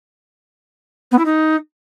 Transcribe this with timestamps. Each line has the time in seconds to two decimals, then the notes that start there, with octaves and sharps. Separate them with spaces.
1.11 B3
1.18 E4
1.25 D#4